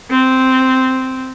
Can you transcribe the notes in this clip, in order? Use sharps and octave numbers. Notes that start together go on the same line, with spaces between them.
C4